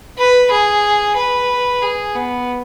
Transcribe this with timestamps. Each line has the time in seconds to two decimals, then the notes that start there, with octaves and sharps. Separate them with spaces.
0.18 B4
0.51 G#4
1.17 B4
1.82 G#4
2.15 B3